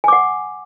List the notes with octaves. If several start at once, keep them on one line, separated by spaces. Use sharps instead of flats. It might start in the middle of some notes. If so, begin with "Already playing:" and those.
F#5 G#5 D6